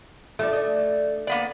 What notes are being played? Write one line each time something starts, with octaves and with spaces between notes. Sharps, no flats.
F3 G3 A3 D4
D2 D5 D#5
A#3 B3 D5